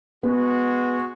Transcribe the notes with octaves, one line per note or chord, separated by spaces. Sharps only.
G#3 B3 F#4